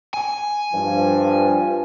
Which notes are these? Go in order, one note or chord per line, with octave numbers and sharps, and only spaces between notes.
G#5
G2 F3